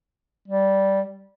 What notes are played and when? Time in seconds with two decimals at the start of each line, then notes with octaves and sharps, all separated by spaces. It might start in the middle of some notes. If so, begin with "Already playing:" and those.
0.48 G3